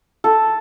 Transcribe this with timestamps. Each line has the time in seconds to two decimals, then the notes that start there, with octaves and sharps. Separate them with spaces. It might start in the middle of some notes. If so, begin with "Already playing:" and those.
0.24 A4